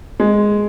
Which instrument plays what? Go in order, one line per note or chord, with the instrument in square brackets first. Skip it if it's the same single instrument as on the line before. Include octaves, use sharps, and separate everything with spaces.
[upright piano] G#3